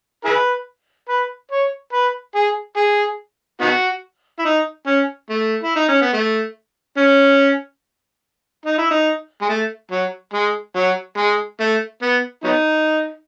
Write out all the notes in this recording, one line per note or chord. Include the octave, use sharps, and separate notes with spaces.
E4 G#4 B4
B4
C#5
B4
G#4
G#4
B3 D#4 F#4
E4
D#4
C#4
A3
E4
D#4
C#4
B3
A3
C#4
D#4
E4
D#4
G#3
A3
F#3
G#3
F#3
G#3
A3
B3
F#3 B3 D#4